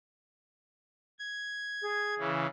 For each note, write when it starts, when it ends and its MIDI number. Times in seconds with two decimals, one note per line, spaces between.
1.19 2.15 92
1.82 2.30 68
2.19 2.47 49
2.19 2.47 52